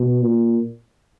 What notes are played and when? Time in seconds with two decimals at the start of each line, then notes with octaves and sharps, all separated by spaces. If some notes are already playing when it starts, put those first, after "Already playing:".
Already playing: B2
0.23 A#2